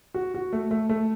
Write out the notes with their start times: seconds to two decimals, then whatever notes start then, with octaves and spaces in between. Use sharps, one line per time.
0.14 F#4
0.34 F#4
0.53 A3
0.71 A3
0.89 A3